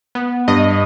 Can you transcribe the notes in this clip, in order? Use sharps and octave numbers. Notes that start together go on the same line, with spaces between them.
B3
G2 D#5